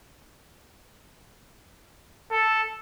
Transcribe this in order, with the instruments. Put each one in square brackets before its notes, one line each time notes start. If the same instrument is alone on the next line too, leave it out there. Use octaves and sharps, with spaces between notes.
[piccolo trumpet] A4